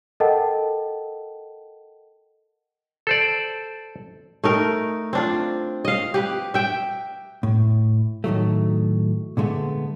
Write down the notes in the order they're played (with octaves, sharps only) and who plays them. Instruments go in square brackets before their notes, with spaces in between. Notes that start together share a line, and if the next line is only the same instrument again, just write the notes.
[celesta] A4 A#4 D#5 F#5 G5 A5
[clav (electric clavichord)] A4 C5 D5
[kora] A3 D#4 A#4
C4 D4 F4
D#5 F5
G4 B4
E5 G5
[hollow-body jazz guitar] A2
A2 D#3 F#3 A3
A#2 D3 G#3 A3 B3